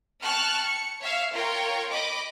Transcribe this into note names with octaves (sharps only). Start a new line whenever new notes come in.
G5 A5 C#6 F6 F#6
C#7
C#5 E5 F5
F4 A#4 C#5 G5
D#5 B5 D6